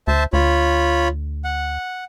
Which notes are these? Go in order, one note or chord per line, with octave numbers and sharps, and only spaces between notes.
D2 C5 E5 A5
D2 F4 C#5 B5
F#5